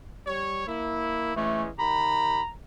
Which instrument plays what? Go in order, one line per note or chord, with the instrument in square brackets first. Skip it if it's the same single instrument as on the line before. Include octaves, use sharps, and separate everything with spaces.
[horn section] G3 C#5
A#3 E4
[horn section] E3 G#3 C#4 [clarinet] A3
[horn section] D#3 G4 B5 [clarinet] A#5